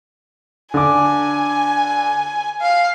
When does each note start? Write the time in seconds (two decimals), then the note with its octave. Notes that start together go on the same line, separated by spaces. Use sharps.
0.74 D3 G#5 D6
2.61 F5